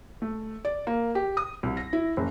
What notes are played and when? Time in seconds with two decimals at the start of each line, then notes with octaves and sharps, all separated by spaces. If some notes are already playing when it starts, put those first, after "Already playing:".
0.22 A3
0.65 D5
0.87 A#3
1.15 G4
1.37 D#6
1.63 C2
1.77 A#6
1.93 E4
2.17 F#1